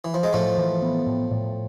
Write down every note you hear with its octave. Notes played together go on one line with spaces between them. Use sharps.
E3
F3
G#3
A2 F3 A3
E3
B3
A2
A2